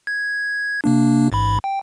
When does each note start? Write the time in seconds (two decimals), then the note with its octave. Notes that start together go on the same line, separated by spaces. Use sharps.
0.07 G#6
0.84 C3 A#3 D4
1.32 A1 G#2 B5
1.64 G5